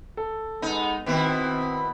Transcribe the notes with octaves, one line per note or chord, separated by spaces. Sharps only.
A4
G#3 B3 D#4
B2 D#3 B3 C4 E4